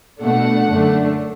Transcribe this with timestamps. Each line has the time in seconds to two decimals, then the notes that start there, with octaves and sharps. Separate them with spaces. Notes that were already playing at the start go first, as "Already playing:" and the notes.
0.21 B2 A3 D4 F#5
0.68 F#2 D3 A3 D4